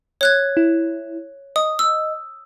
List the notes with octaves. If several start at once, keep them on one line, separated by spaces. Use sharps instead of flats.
C#5 F#6 G#6
E4
D#5 D#6
E6